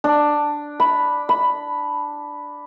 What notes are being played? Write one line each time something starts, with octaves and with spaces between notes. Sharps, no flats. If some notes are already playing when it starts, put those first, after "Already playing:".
D4
B5
B5